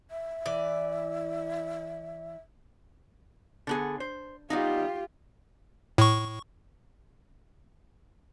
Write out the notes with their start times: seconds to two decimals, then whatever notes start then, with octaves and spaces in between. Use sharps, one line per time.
0.11 E5
0.46 E3 D5
3.67 D3 B3 G#4
4.00 C5
4.50 G3 B3 D#4 F4 G4
5.98 A2 C#6